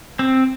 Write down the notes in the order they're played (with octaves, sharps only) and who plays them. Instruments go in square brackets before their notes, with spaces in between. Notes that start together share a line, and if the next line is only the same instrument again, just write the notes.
[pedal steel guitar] C4